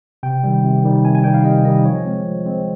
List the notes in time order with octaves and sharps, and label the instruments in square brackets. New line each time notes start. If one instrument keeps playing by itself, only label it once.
[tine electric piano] C3 G5
D#3 G3
C3
D#3 G3
C3 G#5
G#5
D#3 G3 G5
F5
C3 D#5
D#3 G3 D#5
F3 C#5
G#3 C4
F3
G#3 C4